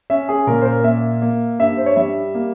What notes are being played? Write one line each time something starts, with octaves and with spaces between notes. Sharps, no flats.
C#4 E5
G#4
A#2 A#4
C5
A#4
A#3 E5
A#3
G2 E5
C5
C#5
G3 E5
A#3